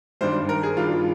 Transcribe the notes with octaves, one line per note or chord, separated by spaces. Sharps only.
G2 D#3 G3 D4 C5
A#4
G#4
G2 D#3 G3 D4 F4